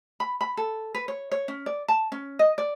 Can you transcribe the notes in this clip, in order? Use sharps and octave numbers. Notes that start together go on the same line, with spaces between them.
B5
B5
A4
B4
C#5
C#5
C#4
D5
A5
C#4
D#5
D5